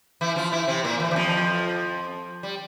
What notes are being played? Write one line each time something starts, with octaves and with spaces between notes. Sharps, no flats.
E3 E4
F3 F4
E3 E4
C3 C4
A#2 A#3
E3
E3
F2 F3
G3